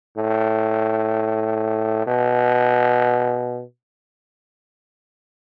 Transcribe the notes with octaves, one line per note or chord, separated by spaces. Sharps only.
A2
B2